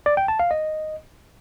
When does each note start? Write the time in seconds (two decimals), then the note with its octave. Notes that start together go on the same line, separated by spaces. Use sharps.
0.06 D5
0.17 G5
0.28 A5
0.40 F5
0.51 D#5